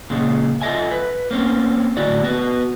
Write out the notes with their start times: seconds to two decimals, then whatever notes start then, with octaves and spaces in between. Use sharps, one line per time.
0.10 A#2 C#3 G#3
0.62 F4 A4 A#4 D#5 E5 G#5
0.91 B4
1.31 A#3 C4 C#4
1.97 A2 D3 E4 F#4 D5
2.23 B3 F#4 B4